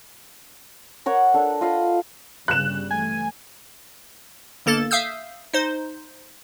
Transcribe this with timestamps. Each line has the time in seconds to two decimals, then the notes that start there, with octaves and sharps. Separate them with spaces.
1.06 A#4 C#5 F#5
1.34 D4 A4
1.61 F4 D#5 F5 B5
2.48 G1 C#3 G3 F#6 E7
2.91 E3 A3 G#5
4.66 G1 A#3 A4 A6
4.91 E5 F5 D#6 E6 G6
5.53 D#4 C5